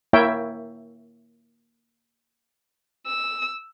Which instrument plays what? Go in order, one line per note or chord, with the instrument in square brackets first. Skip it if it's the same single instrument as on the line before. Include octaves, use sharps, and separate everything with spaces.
[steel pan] A#3 E4 A#4 C#5 E5 G5
[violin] E6